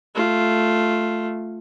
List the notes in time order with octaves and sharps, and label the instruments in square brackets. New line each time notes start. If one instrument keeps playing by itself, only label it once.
[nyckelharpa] A3 F4